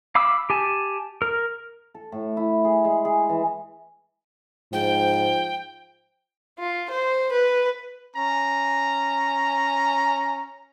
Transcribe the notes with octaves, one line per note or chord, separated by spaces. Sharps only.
F5 B5 D6 E6
G4 G#5 A5
A#4
A4
A2
E4
G#4
G#3
G#4
E3
G#2 F3 G5
F4
C5
B4
C#4 A#5